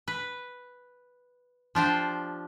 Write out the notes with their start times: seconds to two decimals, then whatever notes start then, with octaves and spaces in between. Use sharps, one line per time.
0.08 B4
1.75 F3 D4 G4 C5